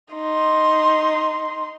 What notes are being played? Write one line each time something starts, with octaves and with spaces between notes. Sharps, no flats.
D#4 C6